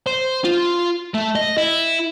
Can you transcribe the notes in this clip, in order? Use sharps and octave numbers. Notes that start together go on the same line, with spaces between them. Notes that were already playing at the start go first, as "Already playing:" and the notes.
C5
F4
A3
D#5
E4